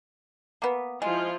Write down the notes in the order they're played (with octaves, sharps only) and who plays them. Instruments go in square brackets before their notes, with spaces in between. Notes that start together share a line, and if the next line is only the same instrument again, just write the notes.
[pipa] A#3 B3
[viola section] F3 E4 F4 [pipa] G#3